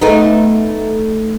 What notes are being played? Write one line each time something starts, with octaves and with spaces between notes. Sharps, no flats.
A3 B3 D#4